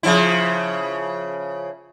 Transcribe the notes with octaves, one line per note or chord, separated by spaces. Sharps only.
C#3 F3 E4